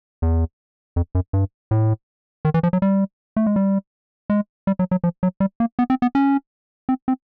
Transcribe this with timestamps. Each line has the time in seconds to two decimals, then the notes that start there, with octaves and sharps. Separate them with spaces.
0.22 E2
0.96 F2
1.15 F#2
1.33 G2
1.71 A2
2.45 D#3
2.54 E3
2.63 F3
2.73 F#3
2.82 G3
3.36 A3
3.46 G#3
3.56 G3
4.30 G#3
4.67 G3
4.79 F#3
4.91 F#3
5.04 F3
5.23 F#3
5.40 G3
5.60 A#3
5.79 B3
5.90 C4
6.02 B3
6.15 C#4
6.89 C4
7.08 C4